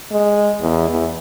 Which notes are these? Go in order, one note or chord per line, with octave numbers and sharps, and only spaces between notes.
G#3
E2
E2